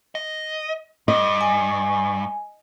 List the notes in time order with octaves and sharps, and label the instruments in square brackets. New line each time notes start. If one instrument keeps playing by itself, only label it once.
[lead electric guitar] D#5
[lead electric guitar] G2 [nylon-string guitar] D#5
[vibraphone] G#5